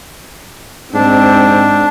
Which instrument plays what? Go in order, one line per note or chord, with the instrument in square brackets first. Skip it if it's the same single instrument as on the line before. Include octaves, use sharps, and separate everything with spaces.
[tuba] G#2 [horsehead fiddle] C4 [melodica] D4